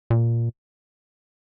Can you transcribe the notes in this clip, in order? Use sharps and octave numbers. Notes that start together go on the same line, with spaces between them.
A#2